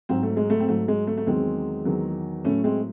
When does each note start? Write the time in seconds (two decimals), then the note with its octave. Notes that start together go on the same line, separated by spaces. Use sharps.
0.09 G#2 F#3 C4
0.23 A3
0.37 G#3
0.50 A3
0.60 C4
0.68 G#2 F#3 A3
0.88 G#3
1.07 A3
1.17 A3
1.27 E2 D#3 F#3 G#3 C4
1.85 E2 D#3 F#3
2.45 A2 F#3 A3 C#4
2.64 G#3 C4